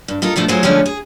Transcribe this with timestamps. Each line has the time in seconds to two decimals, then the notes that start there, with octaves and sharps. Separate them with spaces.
0.08 G2
0.22 D#4 F4 A4 A#4
0.36 G2 B2 F3 A3
0.48 F#3 G#3 A3 F4 G#4 C5
0.63 D3 F3 G#3 A3 B3 C#4
0.86 G#4